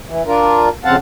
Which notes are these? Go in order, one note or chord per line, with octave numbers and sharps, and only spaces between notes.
E3
D4 F4 A#4
F2 C#3 C4 F5 F#5 A5